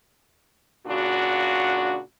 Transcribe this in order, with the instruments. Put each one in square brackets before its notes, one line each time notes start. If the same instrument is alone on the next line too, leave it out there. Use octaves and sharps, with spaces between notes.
[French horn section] A#2 C#3 D4 F#4